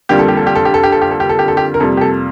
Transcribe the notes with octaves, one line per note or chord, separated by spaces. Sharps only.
F2 D3 G3 A#3 G4
A4
G4
A4
G4
A4
G4
A4
G4
A4
G4
A4
G4
A4
G4
A4
G4
A#4
F2 C3 G3 A#3 A4
G4
A4